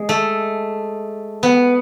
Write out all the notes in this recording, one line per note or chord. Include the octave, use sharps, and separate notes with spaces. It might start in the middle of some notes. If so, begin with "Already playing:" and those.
Already playing: G#3
A3
B3